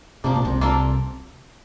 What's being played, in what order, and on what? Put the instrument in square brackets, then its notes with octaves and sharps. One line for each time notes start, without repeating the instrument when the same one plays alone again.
[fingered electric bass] C3 [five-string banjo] F3 A#3 D4
[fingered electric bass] A#2
C2 C3
[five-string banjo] A#3 D4 F4 A4